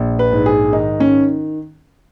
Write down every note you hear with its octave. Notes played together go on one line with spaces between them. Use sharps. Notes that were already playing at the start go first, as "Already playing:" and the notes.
Already playing: A#1
B4
G#2
G#4
D#3 D#4
C#4